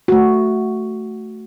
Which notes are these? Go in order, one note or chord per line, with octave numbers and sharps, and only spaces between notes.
A3 F#4